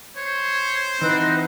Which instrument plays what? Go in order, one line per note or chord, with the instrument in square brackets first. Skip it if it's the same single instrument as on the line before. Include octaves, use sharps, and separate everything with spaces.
[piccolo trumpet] C5 [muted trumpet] C#5
[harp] E3 F#5 [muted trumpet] C4 [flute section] D#4 B4 F#6